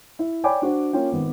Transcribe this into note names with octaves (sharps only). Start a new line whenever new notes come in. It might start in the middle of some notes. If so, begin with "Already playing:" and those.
E4
C#5 D5 G5 G#5 B5 D6
D4 F#4 C5
A#3 C#4 F4 G5
G#1 B3